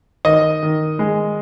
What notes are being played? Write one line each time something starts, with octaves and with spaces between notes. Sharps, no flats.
D#3 D#5
D#3
G#3